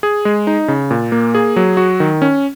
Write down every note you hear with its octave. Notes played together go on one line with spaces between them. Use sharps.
G#4
G#3
D#4
C#3
A#2
A#3
G#4
F#3
F#4
D#3
C#4